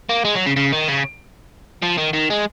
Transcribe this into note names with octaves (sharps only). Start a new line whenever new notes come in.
A#3
G#3
F#3
C#3
C#3
D#3
C#3
F3
D#3
D#3
G#3